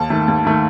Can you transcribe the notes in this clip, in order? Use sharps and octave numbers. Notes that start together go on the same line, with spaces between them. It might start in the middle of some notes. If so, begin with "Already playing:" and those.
Already playing: D#2 A5
D#3 A3
D#2
D#3 A3